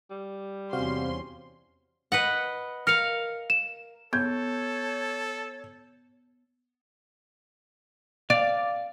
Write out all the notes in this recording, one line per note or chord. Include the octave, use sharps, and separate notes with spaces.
G3
E2 C3 C#4 F#4 C5 F5 C6
B4 D#5 F#5
A#4 F5 F6 C#7 F7
E7
B3 A4 C#5 G6 G#6
D5 F5